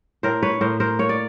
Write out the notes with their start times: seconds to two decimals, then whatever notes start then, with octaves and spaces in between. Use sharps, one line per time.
0.23 A2 A#4 C5
0.43 B4 C#5
0.61 A2 A#4 C5
0.80 A#4 C5
0.99 A#3 C#5
1.09 D5